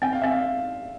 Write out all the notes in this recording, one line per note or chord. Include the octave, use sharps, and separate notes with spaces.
C4 G5
F5
C4 E5
F5